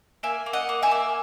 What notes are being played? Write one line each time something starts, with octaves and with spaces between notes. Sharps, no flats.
A#3 E5 G#5
A#3
D#5 F#5
A#3
E5 G#5
A#3